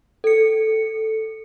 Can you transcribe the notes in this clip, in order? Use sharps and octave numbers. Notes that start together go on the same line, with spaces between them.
A4 C#7